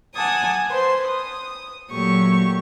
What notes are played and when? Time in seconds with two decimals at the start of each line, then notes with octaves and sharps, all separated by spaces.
0.14 F#5 G#5 A5 D6 D#6
0.69 B4 C5 C6
1.09 D#6
1.92 A#2 F#3 A3 G4 C#6